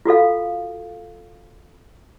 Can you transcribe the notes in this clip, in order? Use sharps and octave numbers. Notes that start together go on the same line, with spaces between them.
F4 F#4 A4 F5